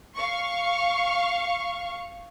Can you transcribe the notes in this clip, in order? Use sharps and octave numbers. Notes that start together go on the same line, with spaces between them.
F5 C#6